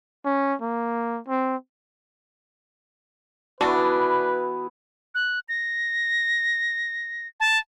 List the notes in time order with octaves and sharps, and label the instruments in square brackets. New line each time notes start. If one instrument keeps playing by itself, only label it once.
[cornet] C#4
A#3
C4
[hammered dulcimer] E3 B3 E4 [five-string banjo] D4 [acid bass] F#4 [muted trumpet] B4
[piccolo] F#6
A#6
A5